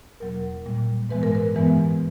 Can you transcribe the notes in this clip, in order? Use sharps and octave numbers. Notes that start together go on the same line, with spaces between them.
E2 B2 F#3 A#3 A#4
A#2 G3 A#3
G#2 E3 G#3 B3 B4
A#4
B4
G2 E3 G#3 B3